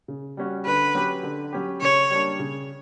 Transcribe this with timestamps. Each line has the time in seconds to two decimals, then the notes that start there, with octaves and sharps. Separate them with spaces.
0.08 C#3
0.37 G3 C#4 F#4
0.65 D3 B4
0.95 F#3 C#4 G4
1.23 D3
1.53 F#3 C#4 G4
1.81 C#3 C#5
2.10 G3 A#3 D4
2.39 C#3